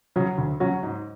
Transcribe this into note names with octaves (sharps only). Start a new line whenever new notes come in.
C#3 F#3 C#4 F#4
D2
C#3 F#3 C#4 F#4
G#2